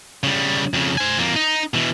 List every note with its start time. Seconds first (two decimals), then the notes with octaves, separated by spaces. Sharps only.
0.23 C#3 G3
0.74 F2 C#3
0.98 C5 G#5
1.18 F2 A#3
1.36 D#4
1.74 B2 E3